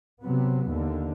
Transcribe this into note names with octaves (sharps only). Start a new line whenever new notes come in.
C3 F#3 B3
D#2 D3